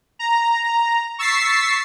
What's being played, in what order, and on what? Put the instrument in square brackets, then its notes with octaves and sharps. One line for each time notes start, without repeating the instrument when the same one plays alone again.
[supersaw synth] A#5
C#6 E6 A6 B6 C7